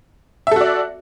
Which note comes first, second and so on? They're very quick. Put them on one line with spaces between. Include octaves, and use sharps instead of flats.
E5 A4 F#4 D5